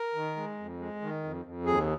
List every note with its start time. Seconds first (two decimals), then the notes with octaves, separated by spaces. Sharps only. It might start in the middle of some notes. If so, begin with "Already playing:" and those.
Already playing: A#4
0.15 D#3
0.36 G#3
0.58 F2
0.79 G#3
1.02 D#3
1.24 F2
1.45 F2
1.66 D#2 G#4